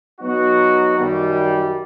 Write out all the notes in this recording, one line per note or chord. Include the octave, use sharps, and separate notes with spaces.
F#3 B3 D#4 F#4
F#2 D#3 G3